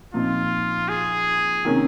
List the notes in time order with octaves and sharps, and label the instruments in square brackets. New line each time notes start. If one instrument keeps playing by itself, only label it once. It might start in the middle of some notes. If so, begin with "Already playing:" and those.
[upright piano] A#2 F3 C4 D#4 [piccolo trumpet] F4
[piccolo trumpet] G#4
[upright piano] C3 D#3 A#3 C#4